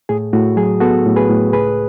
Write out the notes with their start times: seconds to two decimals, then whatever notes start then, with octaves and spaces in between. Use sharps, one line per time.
0.09 A2 G#4
0.33 A2 F#4
0.56 F#3 G#4
0.80 B3 F#4 A4
1.06 A2
1.16 G#4 B4
1.30 A2
1.53 C#2 G#4 B4